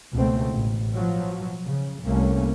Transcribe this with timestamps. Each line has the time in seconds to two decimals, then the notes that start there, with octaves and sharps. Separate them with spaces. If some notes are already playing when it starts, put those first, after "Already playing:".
0.12 C#2 B2 A3 C4
0.51 A1
0.93 B2 F3 F#3
1.66 C#3
2.02 C2 A3 A#3 C#4